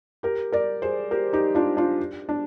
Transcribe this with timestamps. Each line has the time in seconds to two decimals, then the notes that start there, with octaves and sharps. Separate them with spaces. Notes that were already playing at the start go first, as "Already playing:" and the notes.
0.23 G4 A#4
0.52 A#4 D5
0.82 G#4 C5
1.11 G4 A#4
1.33 D#4 G4
1.55 D4 F4
1.77 D4 F4
2.29 D4